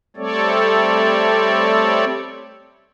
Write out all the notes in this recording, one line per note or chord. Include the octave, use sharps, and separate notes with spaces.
G3 A3 C4 A4 C#5 D5